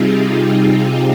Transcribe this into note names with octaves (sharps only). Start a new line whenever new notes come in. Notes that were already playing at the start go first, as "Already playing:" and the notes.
Already playing: C3 G3 C4 D#4 F4 G4 G#4